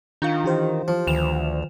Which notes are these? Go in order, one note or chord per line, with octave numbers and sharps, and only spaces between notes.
D#3 D4 F4 F5 G6
E3 G4 C5
F3
D2 D#3 E7 F7